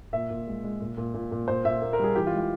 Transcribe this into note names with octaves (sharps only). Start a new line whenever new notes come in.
A#2 E5
A#2
G#3
G#3
A#2
A#2
A#2
A#2
A#2 C5
A#2 E5
A#3
A#4
G3
G#4
E3 G4
F4
G#3
F4